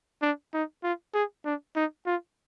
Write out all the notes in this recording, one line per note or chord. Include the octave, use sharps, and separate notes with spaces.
D4
D#4
F4
G#4
D4
D#4
F4